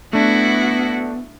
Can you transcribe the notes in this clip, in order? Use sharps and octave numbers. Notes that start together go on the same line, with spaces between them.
A3 B3 D4 E4 F#4